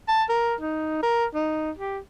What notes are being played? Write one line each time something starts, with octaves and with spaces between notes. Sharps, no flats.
A5
A#4
D#4
A#4
D#4
G4